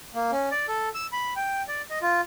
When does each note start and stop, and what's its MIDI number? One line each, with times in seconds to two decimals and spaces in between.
0.14 0.31 58
0.31 0.49 61
0.51 0.66 74
0.68 0.89 69
0.95 1.06 88
1.12 1.34 83
1.36 1.63 79
1.68 1.82 74
1.90 1.99 75
2.02 2.21 65